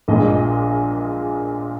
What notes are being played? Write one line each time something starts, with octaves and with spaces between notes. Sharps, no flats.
A#1 A#2 G#3 D#5